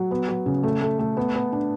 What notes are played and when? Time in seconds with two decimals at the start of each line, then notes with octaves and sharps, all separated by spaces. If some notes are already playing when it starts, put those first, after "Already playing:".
Already playing: F#3
0.11 B3
0.29 F#3
0.46 C#3
0.63 A3
0.81 A3
0.99 A3
1.17 B3
1.35 B3
1.52 D4